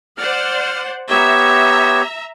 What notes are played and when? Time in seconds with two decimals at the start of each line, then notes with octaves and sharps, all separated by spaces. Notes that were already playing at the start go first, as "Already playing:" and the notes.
0.17 C5 D5 F#5 F6
1.10 B3 G4 C#5 E5 A#5